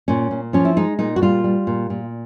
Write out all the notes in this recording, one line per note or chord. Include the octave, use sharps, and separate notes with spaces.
A#2 C#4
A#2
F3 C#4
E4
G#3 D#4
A#2 D#4
F#4
G3 F4
G3
A#2
A#2